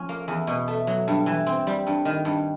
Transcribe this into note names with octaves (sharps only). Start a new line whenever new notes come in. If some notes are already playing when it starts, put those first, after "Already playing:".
Already playing: F3 C#4
A#3
E2
B2
A3
F#3
G2
E3
C4
G3
G2
D#3
G2